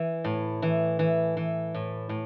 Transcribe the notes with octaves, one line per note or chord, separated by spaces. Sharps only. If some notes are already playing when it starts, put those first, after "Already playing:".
Already playing: E3
A2
E3
E3
E3
A2
A2